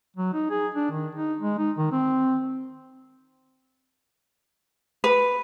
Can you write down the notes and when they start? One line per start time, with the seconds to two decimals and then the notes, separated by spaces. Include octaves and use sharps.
0.17 F#3
0.34 D#4
0.51 G#4
0.75 D4
0.92 D#3
1.15 D#4
1.40 G#3
1.58 D#4
1.78 D#3
1.92 C4
5.04 B4